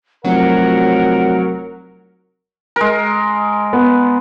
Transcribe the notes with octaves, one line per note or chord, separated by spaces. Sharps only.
F1 F#3 A#4 F#5
G#3 A#4
B3